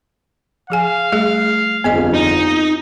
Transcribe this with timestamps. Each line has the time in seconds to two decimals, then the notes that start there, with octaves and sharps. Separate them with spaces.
0.70 F3 G#4 F5 G#5
1.12 G3 A3 G#4
1.84 G1 F2 B3 G#4 D#5
2.14 D#4